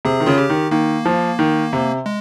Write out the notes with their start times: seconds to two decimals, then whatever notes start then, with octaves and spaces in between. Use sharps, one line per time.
0.05 C3 G#4
0.20 D#3
0.26 C#3 F4
0.38 G4
0.50 D#3
0.71 D#3 A#3
1.05 F3
1.39 D#3
1.73 C3
2.06 G#3